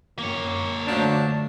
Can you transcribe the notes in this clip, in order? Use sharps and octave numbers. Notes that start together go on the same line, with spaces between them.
F#2 A#3 C#5
D3 F3 F#3 A3 D4